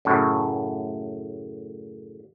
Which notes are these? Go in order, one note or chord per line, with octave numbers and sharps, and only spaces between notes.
F#2 A2 C#3